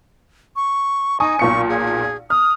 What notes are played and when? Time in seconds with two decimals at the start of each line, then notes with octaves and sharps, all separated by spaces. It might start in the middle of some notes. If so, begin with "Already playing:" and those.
0.56 C#6
1.20 D#4 G#5 C#6 D#6
1.39 B1 A#2 C#6 C#7
1.69 G#4
2.30 D#6 F6